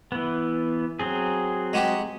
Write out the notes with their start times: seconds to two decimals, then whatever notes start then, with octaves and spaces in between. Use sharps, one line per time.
0.12 E3 B3
0.99 F#3 C4 G#4
1.73 G#3 F#4 G4